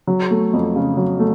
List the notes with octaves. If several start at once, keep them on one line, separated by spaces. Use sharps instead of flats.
F#3
A3
F2
C#3
F#3
A3